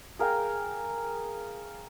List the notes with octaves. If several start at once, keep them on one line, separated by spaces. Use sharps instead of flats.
G#4 A#4 F5 G5